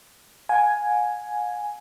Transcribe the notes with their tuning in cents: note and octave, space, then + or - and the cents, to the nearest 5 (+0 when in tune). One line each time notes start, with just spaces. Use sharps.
F5 +45 G#5 +5